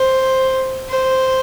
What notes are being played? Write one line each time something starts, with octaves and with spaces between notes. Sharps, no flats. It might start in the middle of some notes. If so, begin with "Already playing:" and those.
Already playing: C5
C5